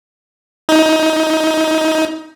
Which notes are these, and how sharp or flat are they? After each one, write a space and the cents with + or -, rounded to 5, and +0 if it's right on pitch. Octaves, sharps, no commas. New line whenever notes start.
D#4 +25